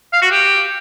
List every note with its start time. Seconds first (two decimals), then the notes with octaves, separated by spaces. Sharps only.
0.13 F5
0.22 F#4
0.31 G4